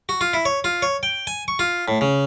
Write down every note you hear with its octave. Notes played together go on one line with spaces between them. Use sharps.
F#4
F4
E4
C#5
F4
C#5
G5
G#5
C#6
F4
A2
C#3